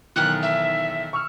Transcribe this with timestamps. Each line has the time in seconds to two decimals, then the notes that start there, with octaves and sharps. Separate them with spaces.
0.16 B1 D#3 E3 F#6
0.42 E5
1.13 C#6 E6 F6